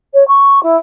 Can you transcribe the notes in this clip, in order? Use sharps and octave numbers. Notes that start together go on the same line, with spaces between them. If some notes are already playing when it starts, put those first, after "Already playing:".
C#5
C#6
E4